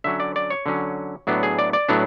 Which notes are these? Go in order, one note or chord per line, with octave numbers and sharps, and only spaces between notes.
D3 F#3 C#4 E5
D5
D5
C#5
D3 F#3 C#4
A2 F#3 B3 D4
G#4
D5
D5
A2 F#3 B3 D4